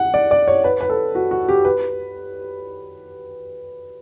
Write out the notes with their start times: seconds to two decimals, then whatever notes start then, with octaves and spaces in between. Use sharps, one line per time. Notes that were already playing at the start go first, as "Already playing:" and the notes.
Already playing: F#5
0.14 D5
0.31 D5
0.48 C#5
0.64 B4
0.81 B4
0.90 A4
1.15 F#4
1.31 F#4
1.48 G4
1.65 B4